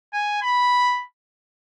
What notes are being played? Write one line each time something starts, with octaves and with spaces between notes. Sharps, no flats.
G#5
B5